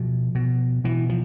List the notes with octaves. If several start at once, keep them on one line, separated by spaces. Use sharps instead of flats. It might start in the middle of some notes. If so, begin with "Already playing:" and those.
Already playing: B2 F3
B2
B2 E3
F3